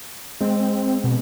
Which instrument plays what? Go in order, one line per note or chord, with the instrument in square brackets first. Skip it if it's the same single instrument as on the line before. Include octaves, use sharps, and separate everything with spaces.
[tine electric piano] G#3 [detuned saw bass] C4
[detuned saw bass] B2